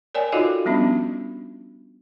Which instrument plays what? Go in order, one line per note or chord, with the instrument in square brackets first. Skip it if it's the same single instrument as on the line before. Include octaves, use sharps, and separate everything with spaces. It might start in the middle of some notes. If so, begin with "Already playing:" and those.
[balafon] A#4 C#5 D5 G5 G#5
D#4 F4 F#4 A4 D#5 F5
F3 G3 B3 C#4 D4